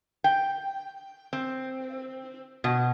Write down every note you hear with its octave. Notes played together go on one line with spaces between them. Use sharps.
G5
C4
B2